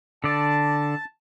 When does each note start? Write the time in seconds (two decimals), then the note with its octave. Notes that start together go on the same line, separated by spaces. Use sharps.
0.24 D3 D5 A5